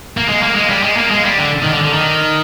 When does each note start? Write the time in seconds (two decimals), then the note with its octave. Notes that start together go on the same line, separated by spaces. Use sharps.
0.17 A#3
0.29 G#3
0.43 A#3
0.55 G#3
0.70 G3
0.83 G#3
0.97 A#3
1.11 G#3
1.25 G3
1.39 D3
1.63 D#3
1.73 D3
1.84 D3
1.93 D#3